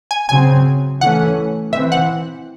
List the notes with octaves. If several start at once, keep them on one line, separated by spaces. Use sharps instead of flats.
G#5
C#3 F#3 C4 G#5
E3 A3 C#4 F#5
E3 C4 E5
F#5